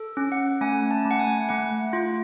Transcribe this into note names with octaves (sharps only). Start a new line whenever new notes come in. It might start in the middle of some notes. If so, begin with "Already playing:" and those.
Already playing: A4
C#4
F#5
A3 G#5
A5
A3
F#5
G#5
A3 F#5
F4